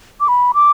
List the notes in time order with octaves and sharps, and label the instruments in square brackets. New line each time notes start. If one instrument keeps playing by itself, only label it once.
[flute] D6
B5
D6